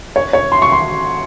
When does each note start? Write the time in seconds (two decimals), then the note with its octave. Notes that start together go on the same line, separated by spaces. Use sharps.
0.16 C#5
0.33 C#5
0.52 C6
0.62 C#6
0.72 C6